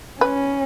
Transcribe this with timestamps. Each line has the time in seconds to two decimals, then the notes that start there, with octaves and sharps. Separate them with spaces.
0.21 C#4 B4